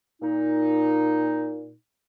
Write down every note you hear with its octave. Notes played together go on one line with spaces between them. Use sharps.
A#2 D#4